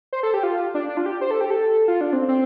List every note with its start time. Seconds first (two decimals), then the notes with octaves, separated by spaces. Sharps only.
0.13 C5
0.23 A4
0.34 G4
0.43 F4
0.75 D4
0.89 D4
0.97 F4
1.06 G4
1.21 C5
1.31 A4
1.41 G4
1.50 A4
1.88 F4
2.01 D4
2.13 C4
2.28 C4